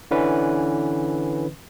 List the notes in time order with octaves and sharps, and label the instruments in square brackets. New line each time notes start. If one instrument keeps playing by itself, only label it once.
[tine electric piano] D3 E3 C#4 B4